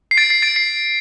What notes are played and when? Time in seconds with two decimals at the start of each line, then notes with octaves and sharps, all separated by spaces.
0.11 C7
0.17 A6 D7
0.30 C7
0.42 A6 D7
0.56 C7